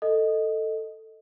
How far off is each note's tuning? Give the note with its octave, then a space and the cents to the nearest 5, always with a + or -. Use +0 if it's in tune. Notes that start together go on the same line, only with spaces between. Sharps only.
A4 +10 D#5 +0